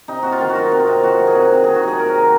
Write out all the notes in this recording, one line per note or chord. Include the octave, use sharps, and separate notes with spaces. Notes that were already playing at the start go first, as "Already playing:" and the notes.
C3 D#4
C3 F#4
F4
D#3
F#4
F#3 F4
C3
F4
C3
D#3 F#4
F#3
G#4
C3
C3
D#3 G#4
F#4
F#3 G#4
F#3 A#4
C3